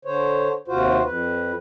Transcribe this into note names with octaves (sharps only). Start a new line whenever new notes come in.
D3 C5 C#5
D#2 C3 F4 F#4 C5
F2 B4